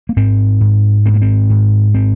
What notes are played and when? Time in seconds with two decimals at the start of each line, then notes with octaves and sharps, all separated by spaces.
0.09 A#3
0.16 G#2 C4
0.60 G#2
1.06 G#2 C4
1.14 A#3
1.22 C4
1.50 G#2
1.95 C4